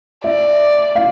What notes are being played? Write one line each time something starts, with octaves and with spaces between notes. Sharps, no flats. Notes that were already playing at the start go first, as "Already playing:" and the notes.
D5 E5
F5